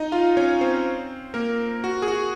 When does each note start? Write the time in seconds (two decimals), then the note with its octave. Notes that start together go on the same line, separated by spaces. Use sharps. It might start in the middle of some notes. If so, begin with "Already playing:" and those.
Already playing: D#4 D#5
0.12 F4 F5
0.37 C#4 C#5
0.61 C4 C5
1.34 A#3 A#4
1.84 F#4
2.02 G#4
2.08 F#4